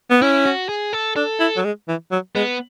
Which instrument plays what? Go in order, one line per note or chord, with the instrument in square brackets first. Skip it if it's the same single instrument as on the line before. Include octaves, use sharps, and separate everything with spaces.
[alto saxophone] B3
[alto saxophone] C#4 [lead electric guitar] E4
[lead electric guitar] F#4
G#4
A4
[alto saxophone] D4 [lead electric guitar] A4
[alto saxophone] E4
F#3
G#3
E3
F#3
[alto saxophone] G#3 [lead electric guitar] B3